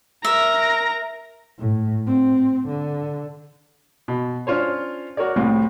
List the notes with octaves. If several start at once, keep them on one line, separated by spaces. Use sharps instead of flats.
A#4 E5 A#5
A2
C4
D3
B2
C#4 D4 F4 C5 C#5
F#4 A#4 C#5 D5
C2 A2 C4